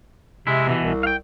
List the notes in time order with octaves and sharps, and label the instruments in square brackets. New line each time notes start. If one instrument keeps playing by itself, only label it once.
[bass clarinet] C3 [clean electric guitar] G#3 E4
[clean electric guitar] B2 D#3 E3
[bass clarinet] C2
[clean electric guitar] F5 G5